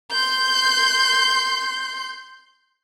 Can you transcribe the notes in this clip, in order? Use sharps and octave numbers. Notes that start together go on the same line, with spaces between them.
C6 G6